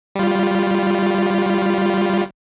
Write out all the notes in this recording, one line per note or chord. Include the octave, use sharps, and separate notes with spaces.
G3 F4